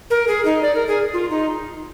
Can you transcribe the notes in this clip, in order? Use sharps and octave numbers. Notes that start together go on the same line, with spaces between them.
A#4
G#4
D#4
D5
A#4
G#4
F4
D#4